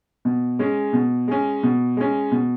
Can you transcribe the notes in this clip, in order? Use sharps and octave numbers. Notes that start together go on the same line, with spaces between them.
B2
G#3 C#4
B2
G#3 C#4
B2
G#3 C#4
B2